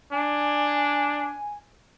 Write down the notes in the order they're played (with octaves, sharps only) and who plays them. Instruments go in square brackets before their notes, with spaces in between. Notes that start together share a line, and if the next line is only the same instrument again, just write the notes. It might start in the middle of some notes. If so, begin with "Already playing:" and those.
[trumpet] D4 [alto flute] G#5